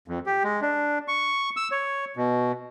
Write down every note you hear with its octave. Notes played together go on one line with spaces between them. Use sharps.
F2
G4
G#3
D4
C#6
E6
C#5
B2